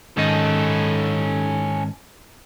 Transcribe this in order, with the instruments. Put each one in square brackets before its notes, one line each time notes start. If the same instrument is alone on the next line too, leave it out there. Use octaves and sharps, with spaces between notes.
[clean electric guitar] G#2 D#3 D#4 [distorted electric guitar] C#4 A4